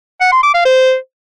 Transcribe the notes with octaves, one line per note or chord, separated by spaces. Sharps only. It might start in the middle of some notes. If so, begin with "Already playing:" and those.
F#5
C6
D6
F5
C5